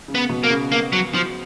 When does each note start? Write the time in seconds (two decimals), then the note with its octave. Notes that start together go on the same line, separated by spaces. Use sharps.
0.08 C#3
0.15 B3
0.29 B2
0.44 A#3
0.50 C#3
0.72 A#3
0.93 F#3
1.14 F3